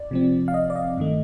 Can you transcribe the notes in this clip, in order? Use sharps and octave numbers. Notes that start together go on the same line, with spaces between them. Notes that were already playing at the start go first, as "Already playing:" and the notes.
Already playing: D5
C3 F3 C4
F5
D#5
D5
D#5
G2 D#3 A3